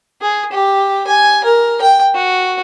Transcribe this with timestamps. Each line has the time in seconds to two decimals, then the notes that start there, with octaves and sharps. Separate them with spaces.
0.21 G#4
0.52 G4
1.07 G#5
1.44 A#4
1.81 G5
2.15 F#4